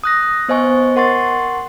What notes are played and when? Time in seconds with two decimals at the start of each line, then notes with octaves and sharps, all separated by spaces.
0.04 D#6 F#6 A#6
0.49 B3 C5 D#5 G#5 C#6
0.96 A#4 F#5 C6 C#6 A6